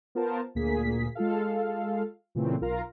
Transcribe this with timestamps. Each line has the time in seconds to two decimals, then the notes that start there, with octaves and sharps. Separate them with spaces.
0.15 B3 F4 A#4 C5 A5
0.55 D2 A#2 A#3 G#4 B6
1.15 G#3 F4 A4 F5
2.35 A#2 C#3 E3 A3 C4
2.61 B1 F4 A#4 F5 A#5